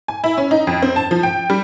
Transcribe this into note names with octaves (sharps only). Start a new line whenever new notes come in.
G#5
E4
C#4
D#4
F2
C4
A5
F3
G5
G3